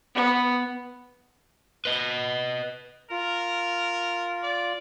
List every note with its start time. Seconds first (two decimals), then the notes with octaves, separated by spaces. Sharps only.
0.15 B3
1.85 B4 D#5
3.11 F4 A#4
4.43 D5